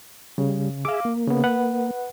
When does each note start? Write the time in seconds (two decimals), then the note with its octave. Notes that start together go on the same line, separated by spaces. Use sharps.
0.38 C#3 G3
0.85 G#4 E5 F5 D6
1.05 A#3
1.27 C#3 B3
1.44 B4 F#5